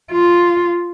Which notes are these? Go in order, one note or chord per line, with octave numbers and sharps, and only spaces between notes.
F4